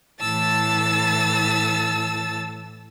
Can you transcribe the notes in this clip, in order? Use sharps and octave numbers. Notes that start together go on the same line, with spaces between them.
A2 E3 A5 E6 A6